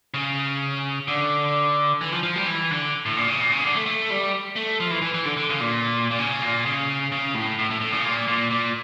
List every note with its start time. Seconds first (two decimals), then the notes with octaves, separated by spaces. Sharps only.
0.14 C#3
1.08 D3
2.01 E3
2.12 F3
2.23 F3
2.36 G3
2.47 E3
2.71 D3
3.06 A2
3.17 A#2
3.28 C#3
3.40 A#2
3.52 C#3
3.63 D3
3.75 A3
3.86 A3
4.10 G3
4.56 A3
4.80 F3
4.91 E3
5.02 E3
5.14 E3
5.25 D3
5.37 D3
5.50 C#3
5.60 A#2
6.11 A#2
6.18 C#3
6.42 A#2
6.65 C#3
7.12 C#3
7.34 A2
7.59 A2
7.70 A2
7.81 A2
7.92 C#3
8.05 A#2
8.28 A#2
8.51 A#2